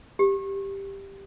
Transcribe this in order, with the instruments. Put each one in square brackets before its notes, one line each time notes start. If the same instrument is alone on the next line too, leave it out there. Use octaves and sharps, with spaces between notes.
[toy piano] G4